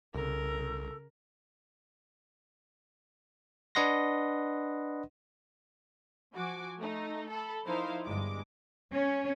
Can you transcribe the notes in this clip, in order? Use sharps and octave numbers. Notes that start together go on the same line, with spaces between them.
C2 C#3 A4 A#4
D4 B4 D#5 F#5 C6 A#6
F3 F#4 G#5 D6
A3 D#4
A4 B5
F3 D#4 E4 A#4 C5 F5
G1 G2 G#3 D6
C#4